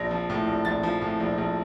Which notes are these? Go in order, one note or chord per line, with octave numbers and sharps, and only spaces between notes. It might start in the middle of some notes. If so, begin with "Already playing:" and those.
Already playing: A#1 A#6
F3
A2
A#1
A#1 A6
F3
A2
A#1
A#1